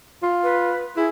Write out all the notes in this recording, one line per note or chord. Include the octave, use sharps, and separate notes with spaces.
F4
B4
E4 G#4